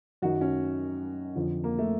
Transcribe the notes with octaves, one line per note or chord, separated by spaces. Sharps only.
F#2 D#3 F#3 F#4
C#4
F2 D3 F3
A#3
A3